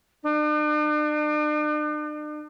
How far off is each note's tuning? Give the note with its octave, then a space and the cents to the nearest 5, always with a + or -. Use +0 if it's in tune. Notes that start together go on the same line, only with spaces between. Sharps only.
D4 +45